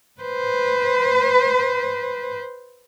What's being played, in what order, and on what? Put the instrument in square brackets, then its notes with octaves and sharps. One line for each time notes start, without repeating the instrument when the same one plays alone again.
[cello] B4 C5